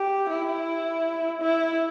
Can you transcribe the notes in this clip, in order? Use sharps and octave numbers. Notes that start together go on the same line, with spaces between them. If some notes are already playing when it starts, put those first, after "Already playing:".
Already playing: G4
E4
E4